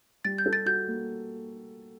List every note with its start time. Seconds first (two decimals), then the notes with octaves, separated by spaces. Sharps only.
0.25 G3 A6
0.38 G6
0.46 A4
0.53 A6
0.66 F#4 G6
0.88 A#3